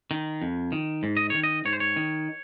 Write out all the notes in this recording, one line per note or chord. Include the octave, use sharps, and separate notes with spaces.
D#3
F2
D#3
G#2
D#5
D#3 C#5
D#5
G#2 C#5
C5
C#5
D#3